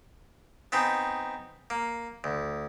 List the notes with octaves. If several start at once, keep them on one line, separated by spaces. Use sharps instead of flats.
B3 C4 D#4 G#4
A#3
D2